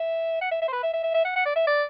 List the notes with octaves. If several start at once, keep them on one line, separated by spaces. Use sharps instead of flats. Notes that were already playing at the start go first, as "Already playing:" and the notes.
Already playing: E5
F#5
E5
E5
C5
B4
E5
E5
E5
E5
F#5
F#5
D5
E5
D5